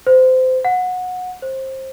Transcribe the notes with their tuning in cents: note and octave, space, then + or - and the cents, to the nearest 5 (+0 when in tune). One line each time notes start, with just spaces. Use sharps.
C5 -25
F#5 -20
C5 +20